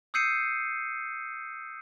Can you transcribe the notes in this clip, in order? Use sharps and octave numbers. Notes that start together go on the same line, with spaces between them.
D#6 E6 G6 C7 C#7 D#7